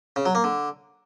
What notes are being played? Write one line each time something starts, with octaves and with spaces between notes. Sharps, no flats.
C#3
F#3
A#3
D3